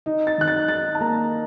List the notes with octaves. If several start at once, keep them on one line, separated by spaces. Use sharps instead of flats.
D#4
A6
D#3 F#6
A6
D#3 A6
A5
A#3 A#5